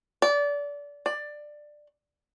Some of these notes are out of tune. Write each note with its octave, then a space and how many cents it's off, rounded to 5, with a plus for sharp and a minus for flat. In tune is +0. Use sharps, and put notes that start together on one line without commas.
D5 -25
D5 +15